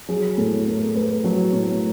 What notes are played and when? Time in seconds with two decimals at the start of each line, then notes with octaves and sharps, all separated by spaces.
0.09 F#3 G#4
0.38 A2 A4
0.67 A3 A#4
0.95 A3 B4
1.24 F#3
1.53 A2